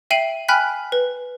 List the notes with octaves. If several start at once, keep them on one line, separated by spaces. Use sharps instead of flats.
E5 G5 C7 D#7 F#7
G5 G#5 B5 F6 F#6 B6
B4